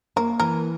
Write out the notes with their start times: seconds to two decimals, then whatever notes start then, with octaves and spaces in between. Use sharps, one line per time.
0.16 A#3 A#4
0.40 E3 A#4